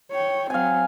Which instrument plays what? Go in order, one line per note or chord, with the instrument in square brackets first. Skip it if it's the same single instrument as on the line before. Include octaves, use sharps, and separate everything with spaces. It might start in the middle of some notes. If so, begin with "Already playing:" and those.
[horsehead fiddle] C#5 G5
[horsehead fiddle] F#3 C4 [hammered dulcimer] F5 G#5